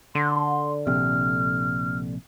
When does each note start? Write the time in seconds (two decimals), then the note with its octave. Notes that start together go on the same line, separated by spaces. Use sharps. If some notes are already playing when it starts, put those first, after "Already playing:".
0.15 D3 C6
0.87 A#1 C3 F6